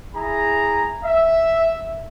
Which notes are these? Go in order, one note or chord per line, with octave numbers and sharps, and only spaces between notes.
E4 G#4 A#5
E5